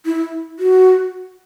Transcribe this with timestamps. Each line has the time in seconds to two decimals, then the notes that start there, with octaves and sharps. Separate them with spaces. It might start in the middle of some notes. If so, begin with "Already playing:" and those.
0.06 E4
0.59 F#4